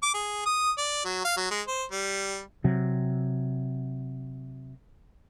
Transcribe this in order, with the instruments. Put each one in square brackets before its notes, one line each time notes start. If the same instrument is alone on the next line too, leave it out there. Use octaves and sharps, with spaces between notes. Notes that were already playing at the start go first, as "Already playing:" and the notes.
[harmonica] D6
G#4
D#6
D5
F#3
F5
F#3
G#3
C5
G3
[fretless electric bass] C3 F#3